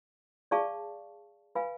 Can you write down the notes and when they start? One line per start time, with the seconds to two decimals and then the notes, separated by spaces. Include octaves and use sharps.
0.51 G#4 D5 F5 A5 C#6
1.55 B4 F5 G#5 B5